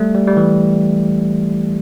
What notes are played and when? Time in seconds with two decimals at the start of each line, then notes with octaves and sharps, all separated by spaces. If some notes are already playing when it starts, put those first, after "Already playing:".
Already playing: G3 A3
0.14 G3
0.28 G3
0.37 E3